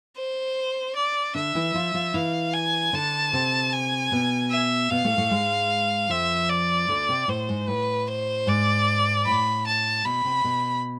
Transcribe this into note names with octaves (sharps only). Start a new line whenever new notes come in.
C5
D5
D3 D4 E5
E3 E4
F3 F4
F3 F4
E3 E4 F5
G#5
D3 D4 A5
C3 C4
G#5
B2 B3
E5
B2 B3 F5
A2 A3
A2 A3
G#2 G#3
F2 F3 E5
D5
D2 D3
C3
A2 C5
G#2
A2 B4
C5
G#2 D5
A2 B5
A5
B2 B5
C3
B2